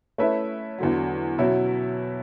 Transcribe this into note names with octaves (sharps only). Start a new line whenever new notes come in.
A3 C#4 E4 B4 E5
E2 D3 F#3
B2 F#3 C#4 E4